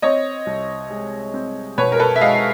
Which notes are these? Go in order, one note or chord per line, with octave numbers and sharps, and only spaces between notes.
C4 C#5 D#5
C2
G#3
C4
B2 B4 C#5
A#4
A4 B4
E5
G#3 D#5 F5